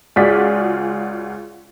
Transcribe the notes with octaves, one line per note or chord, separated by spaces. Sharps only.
C#2 F4 F#4 G#4 D5 B6